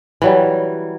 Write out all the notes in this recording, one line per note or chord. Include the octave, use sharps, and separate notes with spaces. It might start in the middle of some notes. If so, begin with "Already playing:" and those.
E3 F#3 G3